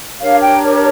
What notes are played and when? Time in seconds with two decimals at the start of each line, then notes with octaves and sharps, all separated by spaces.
0.19 D4 G4 A#4 C#5 F5
0.40 G5